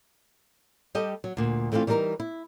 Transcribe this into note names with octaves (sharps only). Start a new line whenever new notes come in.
G3 G4 A4 D#5
F#3
D2 A#2
E3 A3 C4 D4 F4
E3 G3 D#4 A4 A#4
E4